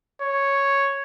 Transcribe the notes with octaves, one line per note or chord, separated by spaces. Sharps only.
C#5